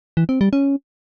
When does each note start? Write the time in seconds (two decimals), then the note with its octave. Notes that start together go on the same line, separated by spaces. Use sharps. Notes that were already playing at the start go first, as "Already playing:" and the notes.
0.17 E3
0.29 C4
0.41 G3
0.53 C#4